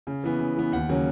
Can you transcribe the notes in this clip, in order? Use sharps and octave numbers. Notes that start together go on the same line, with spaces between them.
C#3
E3 B3
C#3
E3 B3
D#2 F#5
C#3 F#3 A#3 C#4